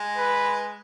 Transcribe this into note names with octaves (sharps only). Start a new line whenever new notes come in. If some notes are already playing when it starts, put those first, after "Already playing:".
Already playing: G#3
B4